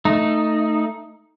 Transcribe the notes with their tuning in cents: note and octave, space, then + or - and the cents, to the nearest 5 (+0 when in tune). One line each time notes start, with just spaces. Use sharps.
A3 +10 D#4 +0